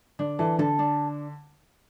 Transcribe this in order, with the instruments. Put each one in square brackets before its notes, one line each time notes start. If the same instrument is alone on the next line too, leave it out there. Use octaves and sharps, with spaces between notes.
[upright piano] D3 [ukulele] D4
[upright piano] E3 [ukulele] A4
[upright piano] D3 [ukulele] A4
[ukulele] D4